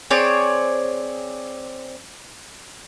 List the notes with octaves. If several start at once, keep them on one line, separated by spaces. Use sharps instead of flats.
C4 G#4 C#5 D5